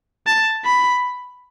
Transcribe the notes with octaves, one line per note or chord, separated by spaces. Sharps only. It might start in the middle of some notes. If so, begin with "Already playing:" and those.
A5
B5